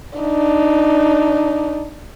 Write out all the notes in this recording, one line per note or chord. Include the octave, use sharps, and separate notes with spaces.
D4 D#4